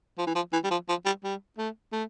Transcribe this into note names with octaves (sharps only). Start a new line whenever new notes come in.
F3
E3
F3
E3
G3
F3
F3
G3
G3
A3
A3